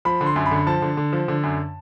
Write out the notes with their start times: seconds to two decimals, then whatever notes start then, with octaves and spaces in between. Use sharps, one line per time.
0.05 F3 B5
0.21 D3
0.26 C6
0.36 F#2
0.46 B5
0.51 D3
0.67 F3 A5
0.82 D3
0.97 D3
1.13 F3
1.28 D3
1.43 F#2